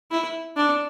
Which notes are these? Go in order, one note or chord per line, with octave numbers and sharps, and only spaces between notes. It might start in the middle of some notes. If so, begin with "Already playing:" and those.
E4
D4